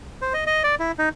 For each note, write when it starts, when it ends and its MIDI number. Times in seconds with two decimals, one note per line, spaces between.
0.22 0.33 72
0.34 0.44 75
0.47 0.63 75
0.64 0.75 74
0.79 0.92 64
0.99 1.09 63